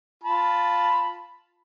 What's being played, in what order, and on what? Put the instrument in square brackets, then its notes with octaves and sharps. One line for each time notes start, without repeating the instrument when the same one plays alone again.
[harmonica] F4 A5 B5